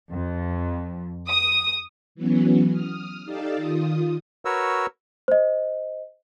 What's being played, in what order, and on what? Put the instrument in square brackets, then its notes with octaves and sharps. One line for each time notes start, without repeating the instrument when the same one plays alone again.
[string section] F2
D#6
[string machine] E3 F#3 B3 C#4
D#6 F6
D#4 G4 A4 D5 F5 A5
D#3 F4 D#6
[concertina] F#4 A#4 B4 C#5 E6
[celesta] C5 D#5